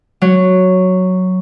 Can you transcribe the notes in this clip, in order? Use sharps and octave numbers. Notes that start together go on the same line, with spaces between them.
F#3